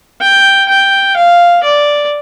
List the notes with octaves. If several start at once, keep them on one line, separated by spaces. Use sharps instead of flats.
G5
G5
F5
D5